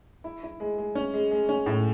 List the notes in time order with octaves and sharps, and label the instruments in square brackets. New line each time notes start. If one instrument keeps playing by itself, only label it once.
[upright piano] E4
E4
G#3
G#3
C#4
G#3
G#3
C#4
A2